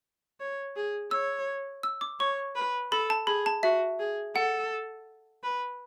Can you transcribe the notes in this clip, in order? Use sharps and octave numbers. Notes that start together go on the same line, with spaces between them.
C#5
G#4
C#5 E6
E6
D6
C#5 C#6
B4
A4 B5
A5
G#4 B5
A5
F#4 E5
G#4
A4 F#5
B4